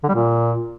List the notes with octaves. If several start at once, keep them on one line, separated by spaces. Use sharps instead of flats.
D3
G3
A#2